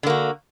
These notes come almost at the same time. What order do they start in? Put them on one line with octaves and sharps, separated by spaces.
D3 A#3 F#4